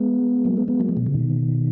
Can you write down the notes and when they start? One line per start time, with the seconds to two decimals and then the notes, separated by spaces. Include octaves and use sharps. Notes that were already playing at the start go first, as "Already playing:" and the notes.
Already playing: G#3 B3
0.45 F#3 A#3
0.57 G#3 B3
0.68 G#3 B3
0.80 F#3 A#3
0.89 F3 G#3
0.97 B2
1.06 C#3
1.14 B2 D#3